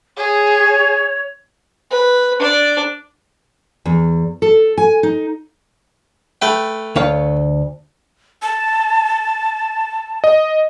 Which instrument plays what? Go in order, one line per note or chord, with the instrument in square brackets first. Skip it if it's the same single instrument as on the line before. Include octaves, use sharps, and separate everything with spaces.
[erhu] G#4 [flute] C#5
[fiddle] B4
D4 D5
[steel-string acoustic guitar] E2
A4
G#5
D#4
[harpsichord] A3 B4 G5
[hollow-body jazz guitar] D2 C#5 F5
[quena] A5
[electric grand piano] D#5